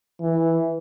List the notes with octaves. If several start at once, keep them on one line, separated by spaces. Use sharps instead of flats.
E3